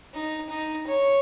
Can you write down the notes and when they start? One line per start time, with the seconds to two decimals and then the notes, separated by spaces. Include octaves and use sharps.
0.14 D#4
0.49 D#4
0.86 C#5